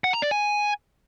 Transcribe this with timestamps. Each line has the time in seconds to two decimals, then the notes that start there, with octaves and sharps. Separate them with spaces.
0.04 F#5
0.13 A#5
0.22 D5
0.31 G#5